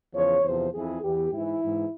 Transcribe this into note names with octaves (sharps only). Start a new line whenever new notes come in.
E2 C#3 F3 C#5
E2 C3 F3 C5
F2 E3 G#4
E2 E3 G4
G#2 E3 E4
G#2 E3